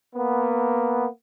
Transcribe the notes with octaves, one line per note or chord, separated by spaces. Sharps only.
A#3 B3